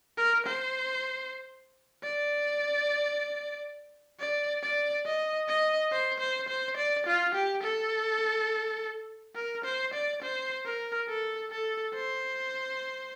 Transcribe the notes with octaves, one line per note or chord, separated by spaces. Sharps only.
A#4
C5
D5
D5
D5
D#5
D#5
C5
C5
C5
D5
F4
G4
A4
A#4
C5
D5
C5
A#4
A4
A4
C5